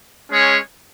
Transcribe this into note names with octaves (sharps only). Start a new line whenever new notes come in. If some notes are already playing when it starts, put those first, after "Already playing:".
G#3 C#4 G#4 C#5